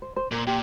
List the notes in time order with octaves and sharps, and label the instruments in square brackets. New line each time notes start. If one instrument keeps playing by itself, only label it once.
[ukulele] C5
C5
[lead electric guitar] A#2 [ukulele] A#4
[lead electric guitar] A#2 [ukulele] G4